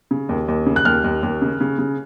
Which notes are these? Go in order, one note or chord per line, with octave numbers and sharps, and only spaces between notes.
C#3
D#2
D#2
C#3
F#6
D#2 F6
D#2
D#2
C#3
C#3
C#3